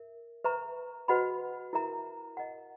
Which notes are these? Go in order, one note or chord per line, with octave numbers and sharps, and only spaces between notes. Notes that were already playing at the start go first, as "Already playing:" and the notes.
Already playing: A#4 E5
B4 E5 A#5 C#6
F#4 B4 D#5 F#5 B5
E4 A#4 E5 A#5
A#4 D#5 F#5